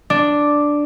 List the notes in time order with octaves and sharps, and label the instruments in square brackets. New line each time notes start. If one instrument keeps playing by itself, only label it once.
[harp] D4